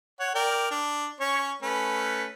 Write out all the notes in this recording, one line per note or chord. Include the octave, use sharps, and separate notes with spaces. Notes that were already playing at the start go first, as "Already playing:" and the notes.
C#5 F#5
A#4 D5 G5
D4
C#4 C#5 C#6
A3 C#4 B4